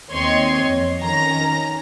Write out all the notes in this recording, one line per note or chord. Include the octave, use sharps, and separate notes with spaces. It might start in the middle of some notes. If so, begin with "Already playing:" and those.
D#2 C4 C#5 D#5 C6 G#6
F2
D#3 C#4 A#5 A#6